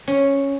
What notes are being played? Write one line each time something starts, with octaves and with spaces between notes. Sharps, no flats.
C#4